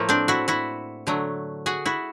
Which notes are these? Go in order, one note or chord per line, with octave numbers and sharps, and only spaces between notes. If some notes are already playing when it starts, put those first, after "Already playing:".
Already playing: A2 F3 A3 A#3
C4 D4
E4 F#4
E4 F#4
D3 F#3 A3
F#4 G#4
E4 F#4